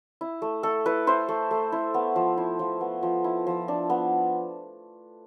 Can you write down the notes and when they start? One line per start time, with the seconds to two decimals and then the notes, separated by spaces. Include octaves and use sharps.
0.21 E4
0.42 A3
0.63 A3 A4
0.86 E4 B4
1.07 E4 C5
1.29 A3
1.51 A3
1.72 E4
1.94 B3
2.16 F3
2.37 E4
2.59 F3
2.81 B3
3.03 F3
3.24 E4
3.47 F3
3.68 D4
3.90 B3